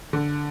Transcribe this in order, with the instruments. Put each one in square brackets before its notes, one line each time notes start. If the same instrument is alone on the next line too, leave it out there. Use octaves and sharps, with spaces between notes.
[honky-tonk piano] D3